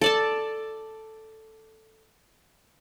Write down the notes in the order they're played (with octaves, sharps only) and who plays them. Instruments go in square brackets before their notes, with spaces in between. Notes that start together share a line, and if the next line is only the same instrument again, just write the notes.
[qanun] A4 D5 A5